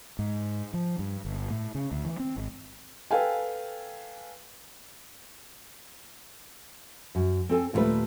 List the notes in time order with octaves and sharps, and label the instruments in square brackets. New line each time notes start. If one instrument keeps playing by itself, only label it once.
[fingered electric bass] G#2
F3
G2
G1
A2
C#3
D2
E3
C4
G#1
[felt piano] A4 B4 F5 G5 G#5
[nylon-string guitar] F#2
C4 A4 G#5
D#2 A#2 E3 G3 A3 B4